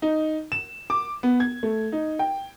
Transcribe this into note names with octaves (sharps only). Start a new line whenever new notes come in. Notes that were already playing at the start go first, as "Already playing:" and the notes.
D#4
E7
D6
B3
G#6
A3
D#4
G5